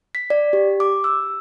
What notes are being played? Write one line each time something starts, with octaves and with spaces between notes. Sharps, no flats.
B6
D5
G4
D6
E6